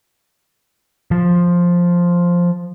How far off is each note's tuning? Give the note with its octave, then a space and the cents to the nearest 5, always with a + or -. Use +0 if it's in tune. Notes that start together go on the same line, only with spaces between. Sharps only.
F3 +5